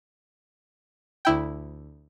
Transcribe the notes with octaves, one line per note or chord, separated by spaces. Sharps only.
D2 E4 G5